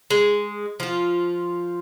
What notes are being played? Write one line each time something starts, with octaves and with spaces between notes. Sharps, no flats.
G#3
F3 F4